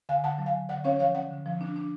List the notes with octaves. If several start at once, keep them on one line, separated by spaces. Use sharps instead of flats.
D3 F5 G#5
D3 F#5 A5
F#3
F5 G#5
D3
D3 D5 F#5
C#4 C#5 F5
F3 C#5 F5
C#4 D5 F#5
D3
F3
D4
D4